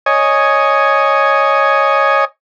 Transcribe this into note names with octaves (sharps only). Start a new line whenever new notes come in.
C#5 D#5 G#5